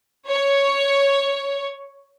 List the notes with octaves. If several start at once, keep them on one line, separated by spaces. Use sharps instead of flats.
C#5